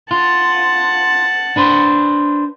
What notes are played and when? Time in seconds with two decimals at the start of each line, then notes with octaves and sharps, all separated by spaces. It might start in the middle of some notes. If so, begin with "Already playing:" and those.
0.11 F4 F#5 A5
1.56 D4 B4 C5